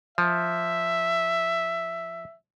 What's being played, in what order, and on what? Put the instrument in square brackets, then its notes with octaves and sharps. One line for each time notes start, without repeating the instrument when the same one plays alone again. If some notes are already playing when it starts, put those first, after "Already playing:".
[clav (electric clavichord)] F3 [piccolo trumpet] E5